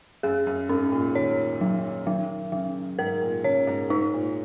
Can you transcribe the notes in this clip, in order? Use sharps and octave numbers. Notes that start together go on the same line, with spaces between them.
F#2 G#4
F#2
G#2 C#4
A#2
D#3 C#5
F#3
D#3 F#3
C#3 F#3
G#2 A#4
A#2
C#3 C#5
G#2
G#2 D#4
A#2